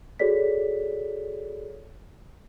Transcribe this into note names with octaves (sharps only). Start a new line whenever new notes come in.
F#4 G#4 A4 C#5 D5 B6